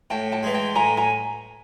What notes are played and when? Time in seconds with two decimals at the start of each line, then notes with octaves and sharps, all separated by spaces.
0.10 A2 G5 A5
0.32 G5 A5
0.43 E3 G#3
0.54 G5 A5
0.75 A2 G#5 A#5
0.97 G#5 A#5